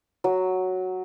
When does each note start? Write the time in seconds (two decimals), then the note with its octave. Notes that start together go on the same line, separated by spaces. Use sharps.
0.24 F#3